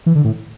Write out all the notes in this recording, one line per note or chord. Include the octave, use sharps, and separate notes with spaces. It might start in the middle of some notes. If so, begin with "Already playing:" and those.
E3
D3
A2